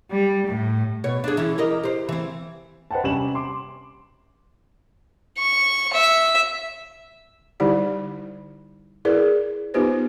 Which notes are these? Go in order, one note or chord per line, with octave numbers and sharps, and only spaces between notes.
G3
A2
B2 C#5
D4 G#4
E3 C#4 E4
G4 A#4 D#5
G4 C5
E3 C4
B4 C5 D#5 F#5 G5 A5
C3 G3 C#4 D5 E7 F#7
C6 D6
C#6
E5
D3 G3 D#4 E4 G4 D5
E4 G#4 A#4 B4 D5
B3 D#4 F4 G4 B4 C5